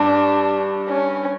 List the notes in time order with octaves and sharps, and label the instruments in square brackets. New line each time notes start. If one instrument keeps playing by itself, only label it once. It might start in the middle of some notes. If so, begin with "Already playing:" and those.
Already playing: [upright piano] G2 [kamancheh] D4
[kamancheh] C#4